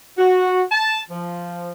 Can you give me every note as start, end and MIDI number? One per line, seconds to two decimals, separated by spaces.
0.18 0.63 66
0.71 1.00 81
1.10 1.72 53